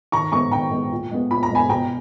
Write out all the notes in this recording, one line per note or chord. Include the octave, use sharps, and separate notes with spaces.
D#3 A#5 C#6
G#3 B3 A#5 C#6
D#3 G5 A#5
G#3 B3
A#2
G#3 B3
A#2 B5
A#5
G#3 B3 G#5 B5
B2 G5 A#5